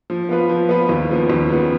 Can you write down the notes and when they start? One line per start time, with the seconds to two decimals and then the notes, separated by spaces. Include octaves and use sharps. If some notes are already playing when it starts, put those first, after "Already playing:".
0.10 F3
0.29 B3 F4 B4
0.49 F3
0.69 B3 F4 B4
0.89 D#2
1.09 C#3 F3 B3
1.30 D#2
1.49 C#3 F3 B3